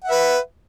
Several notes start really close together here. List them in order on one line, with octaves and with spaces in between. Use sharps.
F#5 E5 B4